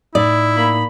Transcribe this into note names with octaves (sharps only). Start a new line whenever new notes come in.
A2 D#4 E4 D5 D#6
A#3 B5